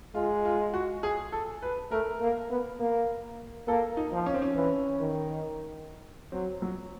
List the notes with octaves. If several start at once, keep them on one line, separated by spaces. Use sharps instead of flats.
G#3 F4
F4
F#4
G#4
A4
B4
A3 A#4
A#3
B3
A#3
A#3 A4
D#4
F3
C#4
C4
C#4
E3
D#3
F#3 C4
F#3